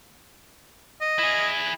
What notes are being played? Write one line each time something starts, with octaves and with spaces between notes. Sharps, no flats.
D#5
E4 G#4